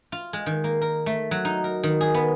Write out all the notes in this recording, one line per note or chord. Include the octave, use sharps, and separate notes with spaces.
F4
G#3
D#3
A#3
A#4
A3
F#3
D#4
A#4
D#3
G#4
B3